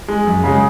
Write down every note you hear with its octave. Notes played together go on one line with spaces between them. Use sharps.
G#3
F#2
C#3 G#3